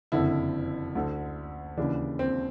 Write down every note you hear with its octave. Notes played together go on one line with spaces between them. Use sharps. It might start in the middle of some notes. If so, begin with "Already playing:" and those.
F#1 F2 D3 E4
D2 D3
D#2 C#3 E3 D4
C4